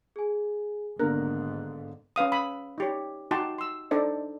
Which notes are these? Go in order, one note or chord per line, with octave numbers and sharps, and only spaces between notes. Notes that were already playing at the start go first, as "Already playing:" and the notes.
G#4 G#5
G#1 G#2 D3 A#3 B3 A#4 F#6
C#4 B4 F5 D#6
B5 D#6 E6
D#4 G4 C#5
D#4 F#4 G5 A5 C6 D6
C6 E6
D4 D#4 A4 C5 D5 D#5